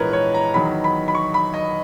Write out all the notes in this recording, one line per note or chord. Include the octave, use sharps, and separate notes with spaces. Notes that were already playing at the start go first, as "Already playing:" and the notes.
Already playing: A#1 G#2 E3 G#3 A#4 B4 C#5
C#5
A#5
E2 D#3 F#3 B5
B5
B5
C#6
B5
D#5